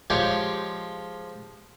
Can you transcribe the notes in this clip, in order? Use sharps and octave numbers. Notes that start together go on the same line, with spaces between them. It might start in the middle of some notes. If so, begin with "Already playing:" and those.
F3 G#3 G4 C#5 F5 G5